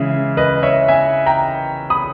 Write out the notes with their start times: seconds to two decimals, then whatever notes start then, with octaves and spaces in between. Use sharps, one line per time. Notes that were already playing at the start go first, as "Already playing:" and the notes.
Already playing: C#3 E3 G#3 E5
0.37 B4 D#5
0.63 C#5 E5
0.88 E5 G#5
1.26 G5 A#5
1.90 B5 D#6